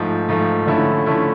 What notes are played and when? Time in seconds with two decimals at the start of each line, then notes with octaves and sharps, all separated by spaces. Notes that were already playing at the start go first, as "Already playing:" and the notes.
Already playing: G#2 F3 A3
0.29 G#2 F3 A3
0.67 D3 F3 A3 C#4 E4
1.06 D3 F3 A3 C#4 E4